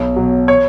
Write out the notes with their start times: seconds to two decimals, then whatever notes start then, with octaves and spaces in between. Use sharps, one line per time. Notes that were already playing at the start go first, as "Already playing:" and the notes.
Already playing: B1
0.16 B2 F#3
0.48 C#5